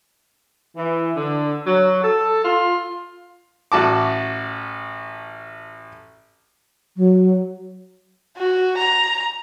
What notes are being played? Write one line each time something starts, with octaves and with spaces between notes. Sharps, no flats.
E3
D3
F#3
A4
F4
A1 F#4 A5 D6
F#3
F#4
A#5